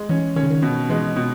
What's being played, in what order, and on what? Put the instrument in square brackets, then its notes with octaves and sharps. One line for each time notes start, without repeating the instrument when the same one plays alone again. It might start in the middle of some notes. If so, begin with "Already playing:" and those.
Already playing: [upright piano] G#3
[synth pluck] E3 [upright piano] C#4
[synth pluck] D#3 [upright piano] C#4
[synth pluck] C#3
D#3
[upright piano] B2
[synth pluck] E3 [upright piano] G#3
[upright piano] B2